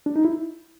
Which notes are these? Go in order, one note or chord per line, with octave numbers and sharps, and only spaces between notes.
D4
D#4
E4